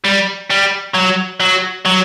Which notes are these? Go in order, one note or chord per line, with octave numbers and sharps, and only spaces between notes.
G3
G3
F#3
F#3
F#3